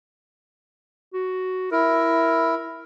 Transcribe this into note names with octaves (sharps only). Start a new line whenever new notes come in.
F#4
E4 A#4